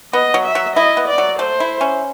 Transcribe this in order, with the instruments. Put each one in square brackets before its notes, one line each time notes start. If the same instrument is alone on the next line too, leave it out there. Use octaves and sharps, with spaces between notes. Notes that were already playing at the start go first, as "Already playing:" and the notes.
[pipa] B3 [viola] D#5
[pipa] F#3
[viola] E5
[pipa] F#3
[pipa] E4 [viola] D#5
[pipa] B3
[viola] D5
[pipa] F#3
[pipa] A3 [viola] C5
[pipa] E4
C#4